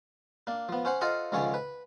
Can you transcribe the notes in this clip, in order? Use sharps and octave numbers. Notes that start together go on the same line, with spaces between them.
A#3 D4
F3 B3
C#4 C5 F#5
F4 A4 C5 D#5 F5 F#5
C#2 D3 D#3 F3 C#4 C#5
B4